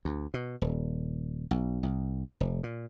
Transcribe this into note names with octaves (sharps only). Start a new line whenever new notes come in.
D2
B2
D#1
B1
C2
F1
A#2